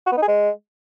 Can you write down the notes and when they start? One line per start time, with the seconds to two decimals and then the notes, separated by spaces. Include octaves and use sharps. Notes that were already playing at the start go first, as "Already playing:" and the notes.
0.07 F#4
0.12 B3
0.17 D#4
0.22 G#4
0.28 G#3